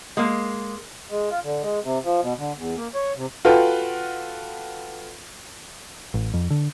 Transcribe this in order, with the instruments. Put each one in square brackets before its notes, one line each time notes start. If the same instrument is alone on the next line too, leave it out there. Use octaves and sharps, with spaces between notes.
[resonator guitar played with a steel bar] G#3 A#3
[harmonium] G#3
F4
D3
G#3
C3
F3
B2
D3
E2
A#3
C#5
C3
[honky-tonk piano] F4 F#4 A4 B4 G5
[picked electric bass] A1
F2
D3